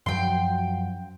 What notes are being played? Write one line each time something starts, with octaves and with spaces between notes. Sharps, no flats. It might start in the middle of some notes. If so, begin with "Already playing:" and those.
F#2 F3 F#3 G5 C6